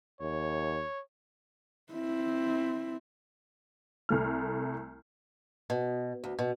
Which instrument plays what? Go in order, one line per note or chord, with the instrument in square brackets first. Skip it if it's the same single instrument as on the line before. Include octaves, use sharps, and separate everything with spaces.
[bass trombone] D#2 [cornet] C#5
[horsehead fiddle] C4 E4
[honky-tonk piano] C2 A3 F6
[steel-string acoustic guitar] B2
D2
B2